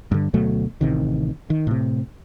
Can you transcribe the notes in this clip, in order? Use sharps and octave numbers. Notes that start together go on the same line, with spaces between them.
G2 D3
D2 B2 F#3 A3
A1 C3 D#3
D#3
A2 C3